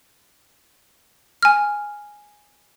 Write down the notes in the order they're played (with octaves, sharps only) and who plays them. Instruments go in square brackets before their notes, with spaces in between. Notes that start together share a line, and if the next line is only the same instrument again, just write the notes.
[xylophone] G#5 F6